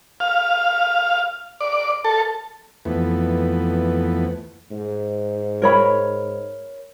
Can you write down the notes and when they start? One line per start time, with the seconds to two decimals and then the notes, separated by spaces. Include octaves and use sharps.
0.20 F5
1.61 D5
2.05 A4
2.85 F2 E3 A3 B3
4.71 G#2
5.62 A#4 C#5 B5